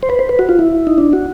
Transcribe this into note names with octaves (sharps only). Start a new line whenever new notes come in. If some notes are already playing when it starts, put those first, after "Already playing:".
C5
B4
C5
B4
F#4
F4
E4
D#4
D4
F#4